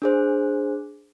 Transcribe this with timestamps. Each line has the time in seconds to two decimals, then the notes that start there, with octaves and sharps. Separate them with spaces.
0.02 D4 G#4 C5